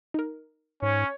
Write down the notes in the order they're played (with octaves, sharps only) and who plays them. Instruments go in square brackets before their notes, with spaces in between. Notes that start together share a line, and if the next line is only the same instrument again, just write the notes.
[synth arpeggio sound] D#4 A#4
[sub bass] G#2 [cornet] C#4 [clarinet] C#5